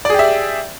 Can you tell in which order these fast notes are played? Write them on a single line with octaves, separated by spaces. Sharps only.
D5 G#4 G4 E5